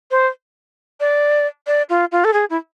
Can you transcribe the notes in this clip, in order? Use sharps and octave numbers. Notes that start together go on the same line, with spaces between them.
C5
D5
D5
F4
F4
A4
G#4
E4